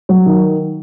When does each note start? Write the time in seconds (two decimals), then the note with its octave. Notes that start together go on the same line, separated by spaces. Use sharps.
0.09 F#3
0.26 D#3